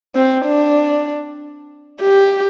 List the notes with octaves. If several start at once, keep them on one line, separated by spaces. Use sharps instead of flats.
C4
D4
G4